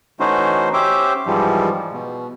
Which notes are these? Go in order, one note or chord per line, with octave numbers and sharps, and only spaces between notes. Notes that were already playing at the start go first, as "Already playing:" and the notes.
E3 A3 C#4 D#4 F#4 C5
C#4 G4 C5 E5 D6
G#2 E3 F3 G3
B2